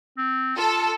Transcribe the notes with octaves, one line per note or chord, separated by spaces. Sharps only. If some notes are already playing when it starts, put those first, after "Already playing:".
C4
F4 A4